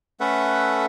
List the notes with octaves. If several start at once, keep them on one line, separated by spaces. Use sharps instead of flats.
A3 C#4 A4 B4 E5 F#5